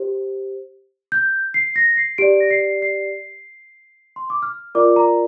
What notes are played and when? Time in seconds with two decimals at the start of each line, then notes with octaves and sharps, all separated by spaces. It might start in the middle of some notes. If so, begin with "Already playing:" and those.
Already playing: G4 C5
1.12 G6
1.54 C7
1.76 A#6
1.97 C7
2.18 G4 D5 D7
2.40 A#6
2.51 C7
2.82 C7
4.16 C6
4.30 D6
4.42 F6
4.75 F4 A#4 D5 D6
4.96 A#5